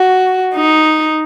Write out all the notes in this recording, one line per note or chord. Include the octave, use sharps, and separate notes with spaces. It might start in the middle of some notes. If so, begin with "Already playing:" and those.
Already playing: F#4
D#4